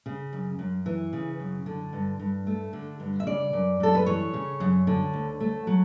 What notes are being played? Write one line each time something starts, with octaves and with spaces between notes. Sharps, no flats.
C#3
F#2
F#2
E3
C#3
F#2
D3
G2
G2
A3
D3
G2
E5
C#3 D5
F#2
F#2 A4
B4
E3 C#5
C#3
F#2
D3
D2
A3
F#3